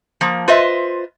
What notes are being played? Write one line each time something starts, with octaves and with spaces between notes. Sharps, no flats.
F3 A#3
F4 B4 C5 D#5 E5